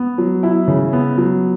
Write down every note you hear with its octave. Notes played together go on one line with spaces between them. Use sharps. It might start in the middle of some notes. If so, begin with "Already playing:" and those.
Already playing: B3
F#3
E4
C#3
B3
F#3